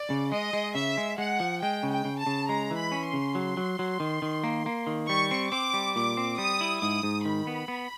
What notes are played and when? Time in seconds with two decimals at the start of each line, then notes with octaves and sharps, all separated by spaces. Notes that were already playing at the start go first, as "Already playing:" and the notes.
Already playing: D5
0.10 C#3
0.32 G#3 D#5
0.53 G#3
0.75 C#3 E5
0.97 G#3
1.18 G#3 F#5
1.40 F3
1.62 G#3 G5
1.83 C#3
1.91 G5
2.05 C#3
2.20 A5
2.26 C#3
2.48 G#3 A#5
2.71 E3
2.78 B5
2.92 C#4
3.06 C6
3.13 C#3
3.35 F#3
3.57 F#3
3.79 F#3
4.00 D#3
4.22 D#3
4.44 A#3
4.66 A#3
4.87 D#3
5.09 G3 C#6
5.31 C4
5.52 C4 D6
5.74 G3
5.95 A#2 D6
6.17 C4
6.38 G3 D#6
6.61 E4
6.82 G#2 D#6
7.03 G#2
7.25 D#3 B5
7.47 B3
7.68 B3